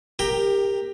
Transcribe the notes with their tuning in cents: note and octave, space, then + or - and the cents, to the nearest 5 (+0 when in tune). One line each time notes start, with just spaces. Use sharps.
G4 +20 A#4 +0 G5 +5